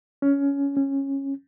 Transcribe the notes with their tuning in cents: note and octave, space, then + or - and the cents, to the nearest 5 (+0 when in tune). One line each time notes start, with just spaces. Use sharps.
C#4 +15
C#4 -15